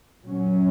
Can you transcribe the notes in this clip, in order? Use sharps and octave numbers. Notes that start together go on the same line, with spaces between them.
A#2 F#3 C#4